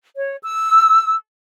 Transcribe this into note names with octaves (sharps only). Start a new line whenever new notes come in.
C#5
E6